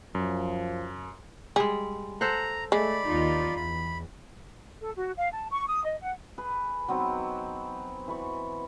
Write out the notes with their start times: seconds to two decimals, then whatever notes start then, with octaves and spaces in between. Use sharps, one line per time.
0.15 F#2 F3
1.56 G3 G#3 G#4
2.21 A4 C5 F#5 A#5
2.72 G#3 A3 D5 B5
3.05 D#2 D#4 F4
3.56 E2 B5
4.81 A4
4.96 F#4
5.18 F5
5.32 A5
5.51 C#6
5.67 D#6
5.85 D#5
6.02 F#5
6.38 G#4 B4
6.88 F#3 B3 C4 D#4
8.08 E3 B5 C#6